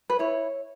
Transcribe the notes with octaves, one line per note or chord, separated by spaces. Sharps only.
B4
E4 C#5